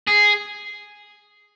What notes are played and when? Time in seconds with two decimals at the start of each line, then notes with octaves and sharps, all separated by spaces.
0.08 G#4